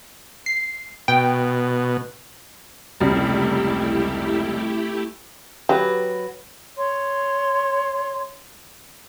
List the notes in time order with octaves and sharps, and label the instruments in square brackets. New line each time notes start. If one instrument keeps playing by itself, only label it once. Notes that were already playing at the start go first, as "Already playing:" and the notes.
[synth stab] C7
[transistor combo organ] B2 [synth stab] G5
[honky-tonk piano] F1 C#2 G3 [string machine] A3 E4 G4
[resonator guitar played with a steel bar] F#3 B4 [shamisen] G4
[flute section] C#5 C6